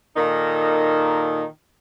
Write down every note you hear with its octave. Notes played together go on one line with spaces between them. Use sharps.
A#2 D#3 D#4 A4